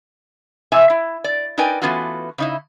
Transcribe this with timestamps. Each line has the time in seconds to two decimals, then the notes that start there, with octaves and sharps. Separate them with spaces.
0.72 C3 E4 E5 G#5
0.90 E4
1.24 D5
1.58 D#4 A#4 B4 D5 G5 G#5
1.82 E3 A3 B3 C#4 F4 F#4
2.38 C#3 D#4 E4